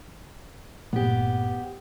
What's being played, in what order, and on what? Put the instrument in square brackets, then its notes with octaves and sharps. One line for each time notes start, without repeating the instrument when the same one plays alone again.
[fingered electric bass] G1 A#2 A3 [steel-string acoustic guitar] B3 G4